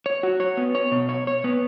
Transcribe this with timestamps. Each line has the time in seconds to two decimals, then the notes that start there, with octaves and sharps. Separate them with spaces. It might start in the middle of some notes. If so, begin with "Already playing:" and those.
0.06 C#5
0.23 F#4
0.40 C#5
0.57 B3
0.75 C#5
0.92 B2
1.09 C#5
1.27 C#5
1.44 B3